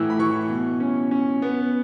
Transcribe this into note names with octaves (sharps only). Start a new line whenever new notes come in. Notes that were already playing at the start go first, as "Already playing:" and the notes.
Already playing: A2 E3 E6
B5
E3 C#6
B2
C#4
C#4
B3